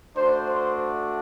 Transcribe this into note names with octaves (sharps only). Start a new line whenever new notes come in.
A3 D4 F#4 C5
C5